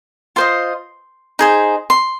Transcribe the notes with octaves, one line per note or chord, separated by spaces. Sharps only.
F4 C5 D#5 C6
D#4 G#4 C5
C6